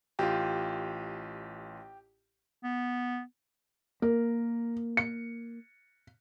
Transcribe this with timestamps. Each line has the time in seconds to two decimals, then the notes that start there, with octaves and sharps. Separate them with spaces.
0.19 A1 F4 G4
2.64 B3
4.02 A#3 A#4
4.97 C#7